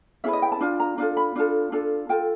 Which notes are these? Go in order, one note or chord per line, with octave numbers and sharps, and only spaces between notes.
C#4 E4 G#4 B4 E5
D#5
G5
A5
D4 F4
A#5
D4 F4 A4
B5
D4 F4 A4
D4 F4 A4
F4 A4 G5